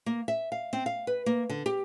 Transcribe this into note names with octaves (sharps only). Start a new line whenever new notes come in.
A#3
E5
F5
C4
F5
B4
A#3
D3
G4